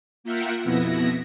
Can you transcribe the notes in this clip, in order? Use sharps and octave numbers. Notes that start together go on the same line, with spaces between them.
A#3 F4 A#4 E5 F#5 G5
F2 B2 B3 E4 A#6